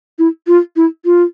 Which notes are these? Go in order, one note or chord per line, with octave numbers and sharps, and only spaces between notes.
E4
F4
E4
F4